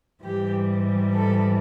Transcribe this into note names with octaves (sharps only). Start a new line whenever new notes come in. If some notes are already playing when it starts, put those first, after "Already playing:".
G#2 E3 G3 G4
A4